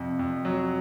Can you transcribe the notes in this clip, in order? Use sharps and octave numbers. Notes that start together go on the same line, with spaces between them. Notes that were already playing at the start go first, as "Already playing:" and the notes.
Already playing: F2 C3
F2
F#3